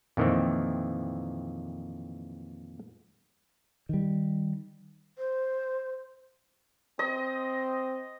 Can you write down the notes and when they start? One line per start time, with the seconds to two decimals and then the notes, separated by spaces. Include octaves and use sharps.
0.17 F2 A#2 D#3 E3 C4
3.89 D#3 G3
5.18 C5
6.99 C4 D#5